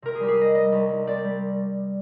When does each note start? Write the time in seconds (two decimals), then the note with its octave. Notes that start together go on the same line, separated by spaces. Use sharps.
0.02 C3 A#4
0.15 G#4
0.20 G3 G4
0.28 G#4
0.37 G3 D#5
0.55 G3 D#5
0.72 C2
0.90 C2
1.07 C4 D5
1.24 G3